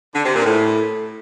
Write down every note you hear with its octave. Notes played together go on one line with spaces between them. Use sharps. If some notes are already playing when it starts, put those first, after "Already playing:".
D3
C3
A#2
A2